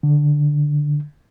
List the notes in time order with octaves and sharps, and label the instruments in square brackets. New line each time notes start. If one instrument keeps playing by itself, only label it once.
[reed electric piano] D3